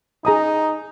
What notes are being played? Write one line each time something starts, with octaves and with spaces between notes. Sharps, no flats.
D#4 G#4 A#5 D#6